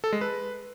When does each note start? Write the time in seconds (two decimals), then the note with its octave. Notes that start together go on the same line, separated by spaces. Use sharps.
0.04 A4
0.13 G#3
0.21 B4